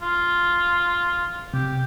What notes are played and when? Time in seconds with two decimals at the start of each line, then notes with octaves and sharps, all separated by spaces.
0.02 F4
1.54 C3 G4